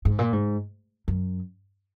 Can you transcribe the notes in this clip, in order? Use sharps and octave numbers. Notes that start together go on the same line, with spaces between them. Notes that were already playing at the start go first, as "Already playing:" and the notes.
G#2
A#2
G#2
F#2